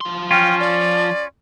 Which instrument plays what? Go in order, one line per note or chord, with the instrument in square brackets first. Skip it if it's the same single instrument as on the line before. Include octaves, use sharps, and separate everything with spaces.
[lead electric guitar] F3 C6
[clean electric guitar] C#4 F4 [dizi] G5
[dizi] D5